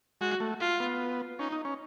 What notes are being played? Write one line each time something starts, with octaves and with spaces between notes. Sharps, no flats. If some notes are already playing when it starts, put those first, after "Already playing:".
G#3 F#4
A3
F4
B3
C#4 D#4
D#4
C#4